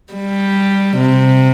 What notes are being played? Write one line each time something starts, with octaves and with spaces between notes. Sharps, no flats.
G3
C3